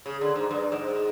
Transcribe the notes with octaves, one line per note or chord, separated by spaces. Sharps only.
C#3
D3
G#2
G2
G#2